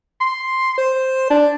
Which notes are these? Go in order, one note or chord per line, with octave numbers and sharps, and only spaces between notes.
C6
C5
D4